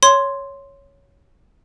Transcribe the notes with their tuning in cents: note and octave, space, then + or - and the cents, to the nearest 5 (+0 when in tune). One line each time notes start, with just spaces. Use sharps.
C#5 +0 C6 +0